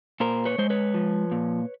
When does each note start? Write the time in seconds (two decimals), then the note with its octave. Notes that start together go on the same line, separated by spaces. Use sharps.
0.20 A#2 A#4 C5
0.45 B4 C#5
0.58 G#3 C5
0.70 B4 C#5
0.94 F3
1.31 A#2